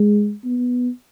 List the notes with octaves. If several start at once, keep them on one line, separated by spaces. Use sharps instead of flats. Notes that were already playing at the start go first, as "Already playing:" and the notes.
Already playing: G#3
B3